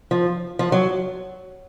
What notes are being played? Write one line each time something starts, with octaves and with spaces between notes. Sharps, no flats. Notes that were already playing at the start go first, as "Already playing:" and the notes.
F3
F3
F#3